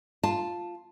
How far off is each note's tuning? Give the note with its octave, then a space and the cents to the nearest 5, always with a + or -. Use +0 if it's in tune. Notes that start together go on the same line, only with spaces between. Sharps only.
F4 +0 A5 +0